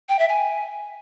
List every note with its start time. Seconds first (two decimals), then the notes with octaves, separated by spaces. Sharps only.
0.09 G5
0.19 E5
0.29 G#5